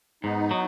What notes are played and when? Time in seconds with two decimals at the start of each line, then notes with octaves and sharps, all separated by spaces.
0.23 G#2 B3 D#4
0.51 F#3